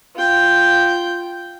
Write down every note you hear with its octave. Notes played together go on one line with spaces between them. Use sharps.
F4 G5